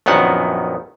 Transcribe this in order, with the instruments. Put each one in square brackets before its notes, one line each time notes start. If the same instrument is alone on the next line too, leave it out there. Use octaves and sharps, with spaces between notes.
[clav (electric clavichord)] A#1 F#2 D#3 B3 F#5